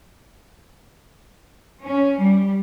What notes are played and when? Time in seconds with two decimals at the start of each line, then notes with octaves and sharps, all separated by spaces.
1.82 C#4
2.17 G3